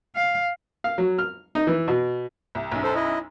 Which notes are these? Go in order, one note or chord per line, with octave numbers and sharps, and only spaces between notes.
F5
F5
F#3
F6
D#4
E3
B2
C2
B1 F#2
A4 C5
E4 D#5